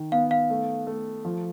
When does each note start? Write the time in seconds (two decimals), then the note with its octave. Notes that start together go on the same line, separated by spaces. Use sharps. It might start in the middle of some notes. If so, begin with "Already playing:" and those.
Already playing: D#3
0.12 B3 F5
0.31 F5
0.50 A3
0.87 A3
1.25 F3